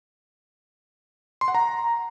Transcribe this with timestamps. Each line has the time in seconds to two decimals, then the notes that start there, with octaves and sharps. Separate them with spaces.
1.41 C6
1.48 F#5
1.55 A#5